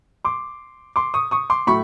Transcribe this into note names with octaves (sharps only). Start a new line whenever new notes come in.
C6 D6
C6 D6
C#6 D#6
C#6 D#6
C6 D6
A2 F#3 A3 B5 C#6